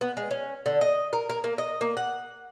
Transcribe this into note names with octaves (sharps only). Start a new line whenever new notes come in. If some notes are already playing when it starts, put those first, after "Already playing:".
B3
G#3
C#4
D3
D#5
A#4
A#4
A#3
D#5
A#3
F#5